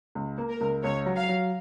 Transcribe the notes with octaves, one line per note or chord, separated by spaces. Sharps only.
C#2
A#3
A#4
C#2
C#2 C#5
F#3
F5
F#3